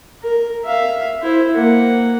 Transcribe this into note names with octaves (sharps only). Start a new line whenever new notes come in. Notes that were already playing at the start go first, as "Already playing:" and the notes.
A#4
E5 F5
E4 C5
A#3 F#5